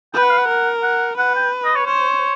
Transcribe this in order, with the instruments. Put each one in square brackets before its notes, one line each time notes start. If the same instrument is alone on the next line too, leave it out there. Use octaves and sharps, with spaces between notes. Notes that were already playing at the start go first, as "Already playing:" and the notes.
[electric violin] B4 [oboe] G5
[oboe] F#5
F5
F#5
[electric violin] A#4
[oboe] F#5
[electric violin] B4 [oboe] F#5
[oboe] G5
D#5
C#5
[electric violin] C5 [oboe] C#5